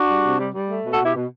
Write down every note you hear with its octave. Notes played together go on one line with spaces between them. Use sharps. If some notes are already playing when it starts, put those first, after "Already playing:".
Already playing: D4 F#4
G3
C3
G3
G3
A3
B2
F#4 A4
B2 E4 G4
B2